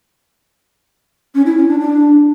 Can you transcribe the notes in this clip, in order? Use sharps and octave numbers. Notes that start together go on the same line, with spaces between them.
C#4
E4
C#4
D4
D4